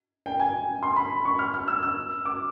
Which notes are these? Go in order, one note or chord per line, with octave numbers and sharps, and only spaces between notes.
G5
G#5
C6
B5
C#6
F6
F6
E6
E6
D6